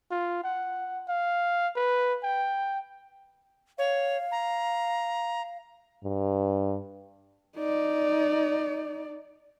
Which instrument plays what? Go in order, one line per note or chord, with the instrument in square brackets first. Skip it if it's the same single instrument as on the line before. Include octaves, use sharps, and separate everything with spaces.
[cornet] F4
F#5
F5
B4
G5
[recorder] C#5 [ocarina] F5
[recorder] A#5
[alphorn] G2
[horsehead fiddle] D#4 D5